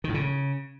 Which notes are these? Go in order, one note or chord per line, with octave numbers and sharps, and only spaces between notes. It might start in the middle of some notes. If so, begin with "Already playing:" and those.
D#3
A2
C#3